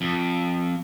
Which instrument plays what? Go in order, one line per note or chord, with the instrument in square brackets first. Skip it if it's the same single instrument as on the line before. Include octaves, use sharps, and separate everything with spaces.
[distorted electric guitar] F2